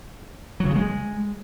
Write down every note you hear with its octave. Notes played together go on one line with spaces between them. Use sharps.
F#3
C#3
F#3
G#3